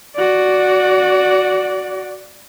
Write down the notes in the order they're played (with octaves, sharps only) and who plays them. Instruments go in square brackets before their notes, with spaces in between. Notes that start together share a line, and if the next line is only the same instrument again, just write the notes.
[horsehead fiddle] F#4 D5